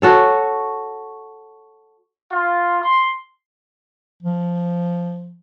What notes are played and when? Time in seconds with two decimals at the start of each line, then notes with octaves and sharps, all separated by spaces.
0.02 F#4 A4 C#5
2.31 F4
2.82 C6
4.23 F3